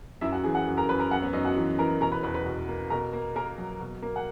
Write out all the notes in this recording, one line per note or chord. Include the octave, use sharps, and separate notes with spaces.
F#2 E4 E5
F#4 F#5
E3 G#4 G#5
F#4 F#5
F#2
A#4 A#5
F#2 B4 B5
A#4 A#5
F#2 F#4 F#5
B3 B4
F#2 D#4 D#5
F#4 F#5
E3
E3 A#4 A#5
B2 A#4 A#5
B4 B5
E2 B4 B5
B4 B5
B2
A#3
B2 A#4 A#5
A#3
A#3 A#4 A#5
F#3
B2
A#3
F#5